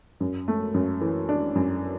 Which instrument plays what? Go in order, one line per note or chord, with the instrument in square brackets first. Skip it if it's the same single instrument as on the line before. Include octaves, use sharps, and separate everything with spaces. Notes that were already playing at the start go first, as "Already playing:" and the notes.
[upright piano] F#2
A3
F#2
E3
D4
F#2